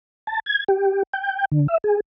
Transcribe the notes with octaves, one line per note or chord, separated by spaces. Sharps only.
A5
G#6
G4
G5
D3
E5
G#4